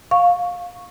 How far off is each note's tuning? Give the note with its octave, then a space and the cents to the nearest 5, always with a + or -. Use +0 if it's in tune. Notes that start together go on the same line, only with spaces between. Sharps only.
F5 +15 C#6 +0